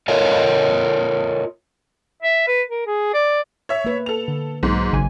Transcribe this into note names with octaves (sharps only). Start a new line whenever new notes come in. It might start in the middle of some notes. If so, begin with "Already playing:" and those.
F4 A4 A#4 C#5 D#5 F5
E5
B4
A#4
G#4
D5
C#5 E5
A#3 B4
A4 F7
D3
B1 G#2 F#3 A#3
G#1 C#3 G#5